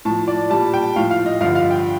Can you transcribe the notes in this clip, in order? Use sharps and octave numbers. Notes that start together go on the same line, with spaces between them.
A2 F3 A5
D5
A#2 G3 A5
G5
A2 F3 F5
F5
D#5
G2 D3 F3 F5
F5
G5